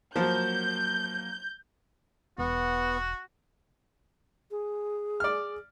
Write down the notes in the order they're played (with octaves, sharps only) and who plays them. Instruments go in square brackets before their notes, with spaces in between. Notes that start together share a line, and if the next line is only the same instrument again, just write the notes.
[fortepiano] F3 [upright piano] F#3 A#3 [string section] G6
[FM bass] E1 [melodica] B3 [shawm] F#4
[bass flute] G#4
[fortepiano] D5 F6